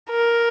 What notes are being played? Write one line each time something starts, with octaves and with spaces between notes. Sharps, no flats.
A#4